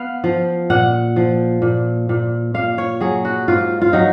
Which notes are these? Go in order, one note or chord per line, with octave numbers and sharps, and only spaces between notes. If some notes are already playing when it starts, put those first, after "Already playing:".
Already playing: B3 F5
F3
A#2 F#5
F3
A#2
A#2
A#2 F5
C#5
F#3 G#4
F#4
G#2 F4
F4
F#3 D#4